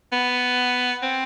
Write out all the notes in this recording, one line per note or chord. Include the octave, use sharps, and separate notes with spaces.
B3
C4